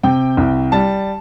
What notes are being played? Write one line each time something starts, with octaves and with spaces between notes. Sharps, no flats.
C3 G5
C2
G3 A5